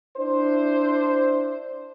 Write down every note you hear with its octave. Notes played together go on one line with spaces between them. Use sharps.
D4 E4 C5